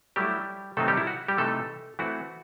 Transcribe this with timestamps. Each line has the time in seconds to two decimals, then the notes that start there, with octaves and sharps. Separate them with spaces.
0.16 F#3 G3 A3 E4 G4
0.77 C3 D#3 F#3 A3 C4 D#4 A4
0.88 G3 G4
0.97 E4
1.07 F#4
1.28 G3 G4
1.38 C3 E3 A3 D#4 A4
1.99 E3 A3 C4 E4 F#4